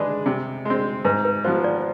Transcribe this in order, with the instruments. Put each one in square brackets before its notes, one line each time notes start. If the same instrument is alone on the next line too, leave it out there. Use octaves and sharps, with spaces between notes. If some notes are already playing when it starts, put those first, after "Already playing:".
Already playing: [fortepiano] G#3 D4 G#4 B4
C3
G#3 C4
[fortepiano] G#2 [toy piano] B4
[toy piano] B4
[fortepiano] F3 B3 F4 [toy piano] C5
[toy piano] D5